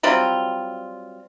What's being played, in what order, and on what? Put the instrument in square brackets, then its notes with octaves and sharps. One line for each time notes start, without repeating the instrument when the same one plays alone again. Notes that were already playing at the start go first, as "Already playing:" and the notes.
[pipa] F#3 G3 C4 F4